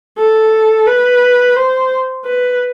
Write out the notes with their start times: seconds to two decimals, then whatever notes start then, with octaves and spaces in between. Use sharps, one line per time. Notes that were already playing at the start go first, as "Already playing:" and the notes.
0.18 A4
0.86 B4
1.56 C5
2.25 B4